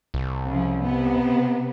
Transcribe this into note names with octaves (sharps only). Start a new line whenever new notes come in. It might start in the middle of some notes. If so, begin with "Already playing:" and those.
C2
C#3 F3
C3 B3